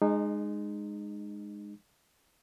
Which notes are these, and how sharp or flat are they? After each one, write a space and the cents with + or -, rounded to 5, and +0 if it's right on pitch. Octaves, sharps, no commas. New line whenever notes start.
G#3 +0 D#4 -30